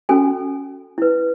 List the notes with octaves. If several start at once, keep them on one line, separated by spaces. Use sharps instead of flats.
C#4 F#4 A4 G#5
E4 B4